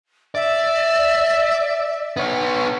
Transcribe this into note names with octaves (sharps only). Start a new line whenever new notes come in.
D5 E5
B3 C#5